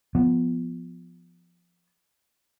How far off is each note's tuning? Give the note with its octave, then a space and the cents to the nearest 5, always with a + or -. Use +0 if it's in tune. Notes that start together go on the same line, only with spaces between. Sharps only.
F3 +0 B3 +0